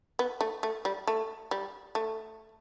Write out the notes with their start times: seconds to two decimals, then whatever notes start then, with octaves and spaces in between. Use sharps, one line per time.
0.19 B3
0.41 A3
0.63 A3
0.85 G3
1.07 A3
1.51 G3
1.95 A3